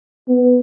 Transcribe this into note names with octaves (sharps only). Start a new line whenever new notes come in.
B3